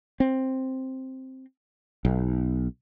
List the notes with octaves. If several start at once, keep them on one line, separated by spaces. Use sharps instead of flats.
C4
B1